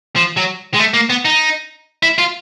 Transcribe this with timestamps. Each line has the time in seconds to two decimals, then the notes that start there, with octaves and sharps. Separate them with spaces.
0.16 F3
0.37 F#3
0.74 G#3
0.79 A3
0.94 A#3
1.10 B3
1.25 D#4
2.03 E4
2.18 F4